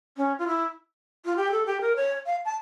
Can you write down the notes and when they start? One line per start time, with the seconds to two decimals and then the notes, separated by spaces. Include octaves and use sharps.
0.17 C#4
0.39 F4
0.48 E4
1.25 F4
1.36 G4
1.52 A4
1.66 G4
1.81 A#4
1.96 C#5
2.26 F5
2.45 A5